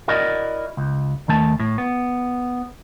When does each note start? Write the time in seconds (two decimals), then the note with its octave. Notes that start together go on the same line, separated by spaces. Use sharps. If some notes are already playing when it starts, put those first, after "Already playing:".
0.08 E4 F#4 A#4 D5 D#5
0.77 C#2
1.28 D#2 D#3 A3 A5
1.60 A2
1.78 B3